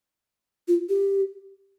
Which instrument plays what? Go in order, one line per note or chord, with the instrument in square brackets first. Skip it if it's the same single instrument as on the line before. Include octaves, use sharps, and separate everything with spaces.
[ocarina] F4
G4